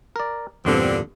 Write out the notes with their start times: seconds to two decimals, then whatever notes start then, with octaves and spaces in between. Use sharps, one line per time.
0.16 A#4 D5
0.65 E2 G2 A#2 D3 C4